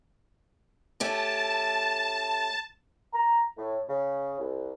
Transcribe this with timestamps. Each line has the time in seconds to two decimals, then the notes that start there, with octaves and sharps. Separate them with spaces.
1.00 A3 C#4 G4 A5
3.13 A#5
3.57 A2
3.89 C#3
4.40 C2